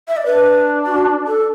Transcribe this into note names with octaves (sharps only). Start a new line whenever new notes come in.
E5
D5
D4 B4
F#4
A4